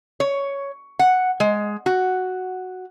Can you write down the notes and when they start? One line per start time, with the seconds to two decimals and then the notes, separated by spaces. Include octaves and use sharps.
0.20 C#5
0.99 F#5
1.40 G#3
1.86 F#4